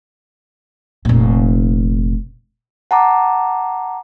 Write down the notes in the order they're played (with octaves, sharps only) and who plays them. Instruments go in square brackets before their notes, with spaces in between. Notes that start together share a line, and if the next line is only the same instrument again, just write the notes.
[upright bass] F1 A#2
[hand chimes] F#5 A5 A#5 D6